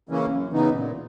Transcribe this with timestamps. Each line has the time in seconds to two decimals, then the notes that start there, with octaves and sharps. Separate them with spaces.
0.09 C#3 E3 A#3 C#4
0.31 F#2
0.52 C#3 E3 B3 D#4
0.74 A#2